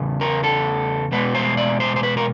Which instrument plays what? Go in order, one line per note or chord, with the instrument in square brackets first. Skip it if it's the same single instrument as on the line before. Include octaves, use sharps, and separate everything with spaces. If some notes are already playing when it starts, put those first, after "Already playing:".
Already playing: [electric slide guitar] E2 C#3
A#4
A4
E2 B2 G#3 B3 B4
C5
D5
C5
C5
B4
A#4